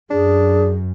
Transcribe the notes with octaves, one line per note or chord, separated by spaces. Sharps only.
F#2 D4 G#4